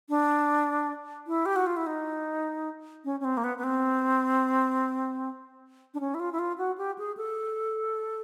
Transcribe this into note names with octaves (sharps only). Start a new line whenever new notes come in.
D4
E4
G4
F#4
F4
E4
D#4
C#4
C#4
C4
A#3
B3
B3
C4
D4
C#4
E4
F4
E4
F4
F#4
G4
G#4
A4